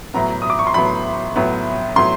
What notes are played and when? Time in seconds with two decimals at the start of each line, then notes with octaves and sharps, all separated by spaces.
0.14 A2 F#3 B3 A#5
0.42 D#6
0.50 D6
0.59 C#6
0.67 C6
0.74 A2 F#3 B3 B5
1.36 A2 F#3 B3
1.96 A2 F#3 B3 C6